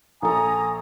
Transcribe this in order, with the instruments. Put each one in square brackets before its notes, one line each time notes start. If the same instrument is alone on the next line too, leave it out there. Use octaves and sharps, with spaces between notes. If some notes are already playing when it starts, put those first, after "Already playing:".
[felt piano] A#1 A4 [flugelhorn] G#5 [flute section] A#5 D#6